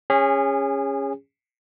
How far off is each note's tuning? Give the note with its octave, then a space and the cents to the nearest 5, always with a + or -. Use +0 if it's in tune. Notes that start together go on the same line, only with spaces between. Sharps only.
C#4 -5 G#4 -30